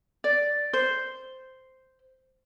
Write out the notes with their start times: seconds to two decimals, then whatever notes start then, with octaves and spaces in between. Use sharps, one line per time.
0.24 D5
0.73 C5